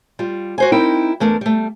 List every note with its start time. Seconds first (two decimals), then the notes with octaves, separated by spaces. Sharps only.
0.19 G3 F4
0.58 F#4 C5 G#5
0.72 C4 D#4 E4 A#4 G5
1.20 E2 A3 D4 A#4
1.41 G3 A3